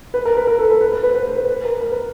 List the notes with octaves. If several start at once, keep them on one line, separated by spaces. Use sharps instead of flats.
B4
A#4
B4
A#4
A4
B4
B4
B4
B4
C5
B4
C5
B4
B4
A#4
A#4
B4